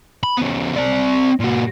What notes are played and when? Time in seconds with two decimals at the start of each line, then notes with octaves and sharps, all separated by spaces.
0.23 B5
0.37 C#3 B3
0.76 C4 D5
1.40 A#2 F#4